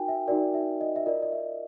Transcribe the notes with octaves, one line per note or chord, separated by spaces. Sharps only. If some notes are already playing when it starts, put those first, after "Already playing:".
Already playing: D#4 F#4 A#4 G5 G#5
E5
D#4 F#4 A#4 D5
E5
D#5
E5
F4 A#4 D5 D#5
D#5
E5